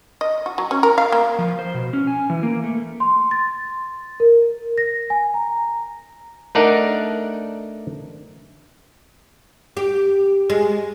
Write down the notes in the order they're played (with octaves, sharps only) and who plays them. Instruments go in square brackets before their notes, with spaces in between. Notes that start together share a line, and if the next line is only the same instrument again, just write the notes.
[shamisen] D#5
F#4
F#3
C#4
A#4
F5
A#3
[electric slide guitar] F3
C5
B2
C#4
G#5
E3
A#3
A3
[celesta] C6
A6
A#4
A#6
G#5
A#5
[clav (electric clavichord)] A3 D4 D#4 A#4 D5 F#5
[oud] G4
G#3